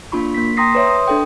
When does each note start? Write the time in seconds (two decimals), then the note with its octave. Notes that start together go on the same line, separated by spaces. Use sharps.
0.12 A#3 D4 F4 B5 C#6
0.34 A#3 B6
0.57 G5 A#5 C6 D#6 A#6 C7
0.75 B4 C#5 E5 C6
0.87 D#6
1.08 D4 A4 G5